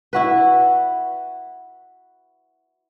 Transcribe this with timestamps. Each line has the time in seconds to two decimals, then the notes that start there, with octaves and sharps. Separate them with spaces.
0.13 E4 F#4 B4